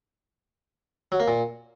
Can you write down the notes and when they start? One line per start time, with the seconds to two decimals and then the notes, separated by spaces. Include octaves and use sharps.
1.12 F#3
1.20 A#3
1.28 A#2